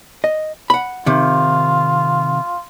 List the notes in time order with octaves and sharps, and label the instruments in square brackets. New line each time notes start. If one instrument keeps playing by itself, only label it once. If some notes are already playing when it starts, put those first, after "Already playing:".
[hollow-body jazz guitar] D#5
F#5 B5
[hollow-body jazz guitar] C3 D#3 [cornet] F4